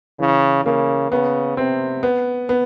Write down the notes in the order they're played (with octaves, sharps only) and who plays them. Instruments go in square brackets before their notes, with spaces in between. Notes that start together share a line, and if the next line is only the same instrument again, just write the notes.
[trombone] C#3 [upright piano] E3
[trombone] C#3 [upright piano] A#3
[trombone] C#3 [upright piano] B3
[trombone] C3 [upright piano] C4
[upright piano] B3
B3